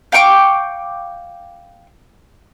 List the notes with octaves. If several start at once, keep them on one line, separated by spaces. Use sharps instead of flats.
F5 G5 C#6 D6